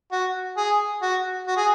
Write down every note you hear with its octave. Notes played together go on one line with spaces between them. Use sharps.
F#4
G#4
F#4
F#4
G#4